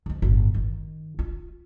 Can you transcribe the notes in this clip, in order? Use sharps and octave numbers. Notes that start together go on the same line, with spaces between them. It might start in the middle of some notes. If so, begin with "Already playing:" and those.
D2 F3
G1 A2
D#3
F4